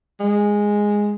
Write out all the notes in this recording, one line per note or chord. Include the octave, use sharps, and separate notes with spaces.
G#3